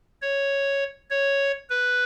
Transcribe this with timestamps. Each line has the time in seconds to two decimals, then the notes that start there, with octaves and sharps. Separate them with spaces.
0.22 C#5
1.11 C#5
1.70 B4